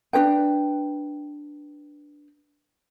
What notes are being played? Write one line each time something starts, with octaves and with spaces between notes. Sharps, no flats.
D4 F#4 B4 G5